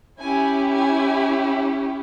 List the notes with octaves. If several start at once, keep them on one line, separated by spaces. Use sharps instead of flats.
C#4 E4 G4 G#5
G#5